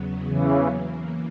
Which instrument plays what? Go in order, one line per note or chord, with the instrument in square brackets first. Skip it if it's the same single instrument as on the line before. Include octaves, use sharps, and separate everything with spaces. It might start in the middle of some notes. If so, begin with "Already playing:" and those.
Already playing: [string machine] E2 C#3 F#3 B3
[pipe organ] C#3 E3
[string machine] C#3 E3 A#3